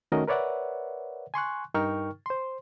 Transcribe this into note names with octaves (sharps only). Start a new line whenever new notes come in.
D#3 A3 C#4 F#4 A#4 D#5
A#4 B4 C#5 D5 E5 F#5
G#5 C6 C#6 F#6
G2 D#4 A#4 G5 C#6 F6
C5 C6